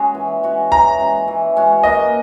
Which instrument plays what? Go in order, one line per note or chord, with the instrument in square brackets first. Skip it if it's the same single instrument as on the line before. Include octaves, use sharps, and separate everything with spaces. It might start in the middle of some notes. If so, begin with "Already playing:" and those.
Already playing: [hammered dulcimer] G#3 C#4 F#4
E3
G#3 C#4 F#4
[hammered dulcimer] E3 [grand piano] A#5
[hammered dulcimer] G#3 C#4 F#4
E3
G#3 C#4 F#4
[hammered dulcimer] A#3 [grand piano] D#5